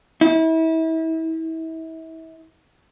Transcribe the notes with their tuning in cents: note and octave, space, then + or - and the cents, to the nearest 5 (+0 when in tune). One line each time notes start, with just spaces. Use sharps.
E4 -35